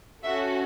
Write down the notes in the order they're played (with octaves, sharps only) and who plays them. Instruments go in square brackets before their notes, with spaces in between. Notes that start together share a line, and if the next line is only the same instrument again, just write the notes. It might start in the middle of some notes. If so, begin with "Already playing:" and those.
[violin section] C#4 F#4 A4 E5